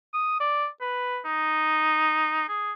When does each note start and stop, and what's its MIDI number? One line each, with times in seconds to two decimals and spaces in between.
0.13 0.38 87
0.40 0.67 74
0.81 1.19 71
1.25 2.48 63
2.48 2.72 68